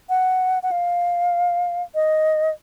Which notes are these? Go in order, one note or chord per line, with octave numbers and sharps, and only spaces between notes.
F#5
F#5
F5
D#5